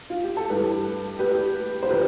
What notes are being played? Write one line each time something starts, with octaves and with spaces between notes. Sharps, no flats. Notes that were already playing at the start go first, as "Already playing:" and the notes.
F4
G4
A4
G2 E3 G4 B4
G4 B4
C5
D3 F3 G4 B4